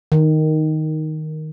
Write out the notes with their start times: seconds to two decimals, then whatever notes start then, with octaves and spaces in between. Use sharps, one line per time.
0.12 D#3